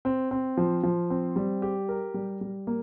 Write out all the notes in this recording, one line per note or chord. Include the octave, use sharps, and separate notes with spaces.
C4
C4
F3
F3
C4
G3
G4
A#4
G3
G3
A#3